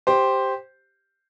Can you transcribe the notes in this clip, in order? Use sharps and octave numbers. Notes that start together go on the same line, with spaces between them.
G4 C5